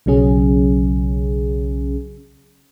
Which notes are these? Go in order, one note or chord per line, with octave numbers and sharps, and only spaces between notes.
B1 C#3 F#3 C#4 G#4